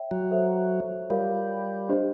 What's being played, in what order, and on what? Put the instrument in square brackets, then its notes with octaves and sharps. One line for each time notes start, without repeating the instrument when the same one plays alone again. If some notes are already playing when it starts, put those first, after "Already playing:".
Already playing: [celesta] C#5 E5 G5
[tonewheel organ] F#3
[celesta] A4 C5 E5
[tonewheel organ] G3 [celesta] F4 A#4 C#5 F5
[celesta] D4 G4 C5 D#5